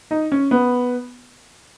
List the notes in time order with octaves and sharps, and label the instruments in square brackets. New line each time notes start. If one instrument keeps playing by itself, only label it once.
[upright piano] D#4
C#4
B3